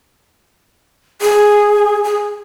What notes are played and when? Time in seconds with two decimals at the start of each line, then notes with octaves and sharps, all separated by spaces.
1.22 G#4
2.04 G#4